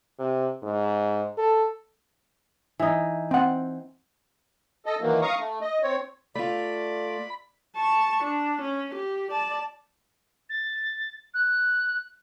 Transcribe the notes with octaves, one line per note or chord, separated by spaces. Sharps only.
C3
G#2
A4
E3 D#4
C4 F#5
A4 D#5
D#3 E3 F#3 A#3
F5 A#5 C#6 D#6
A3
D#5
C4 C#5
A3 F4 D5 B5
A5 C#6
D4
C#4
G4
D5 A5
A6
F#6